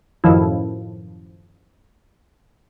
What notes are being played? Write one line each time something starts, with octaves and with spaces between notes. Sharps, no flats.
F#2 A2 D#3 F3 E4